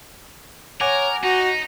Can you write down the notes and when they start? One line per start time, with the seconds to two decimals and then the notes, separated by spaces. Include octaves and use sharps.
0.81 A#4 C#5 F#5 G#5 D6
1.24 D#4 F#4